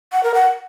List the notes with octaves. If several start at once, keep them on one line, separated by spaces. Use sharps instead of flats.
F#5
A#4
F#5